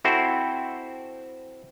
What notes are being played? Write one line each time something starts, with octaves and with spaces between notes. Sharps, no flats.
C4 E4 F#4 A4 C5